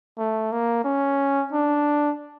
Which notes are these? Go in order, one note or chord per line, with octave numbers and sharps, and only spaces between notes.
A3
A#3
C#4
D4